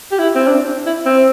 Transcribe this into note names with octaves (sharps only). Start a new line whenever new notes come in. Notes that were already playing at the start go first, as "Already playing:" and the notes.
G4
E4
C4
D4
E4
C4